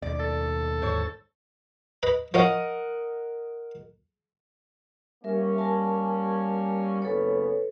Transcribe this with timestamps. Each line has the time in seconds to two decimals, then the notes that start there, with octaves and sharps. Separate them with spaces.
0.02 D#2 B2 D5
0.19 A4
0.82 D#2 G#2 D3 C5 C#5
2.03 B4 D#5 B5
2.34 F3 C#4 A#4 D#5 F#5
5.24 G3 A#3 C#4 A#4 E5
5.58 A#4 G#5 A5
7.02 F#1 B3 C#4 A4 B4 C#5